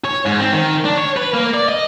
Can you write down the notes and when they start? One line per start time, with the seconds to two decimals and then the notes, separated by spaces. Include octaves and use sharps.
0.04 C#5
0.26 G#2
0.40 C4
0.52 D#3
0.85 D4
0.98 C#5
1.17 B4
1.34 A#3
1.54 D5
1.69 D#5